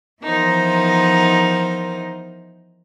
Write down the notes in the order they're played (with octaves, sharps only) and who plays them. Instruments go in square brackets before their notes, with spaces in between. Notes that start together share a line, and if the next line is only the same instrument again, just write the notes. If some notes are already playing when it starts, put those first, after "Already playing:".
[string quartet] E3 F3 B3 D#4 A#4 C5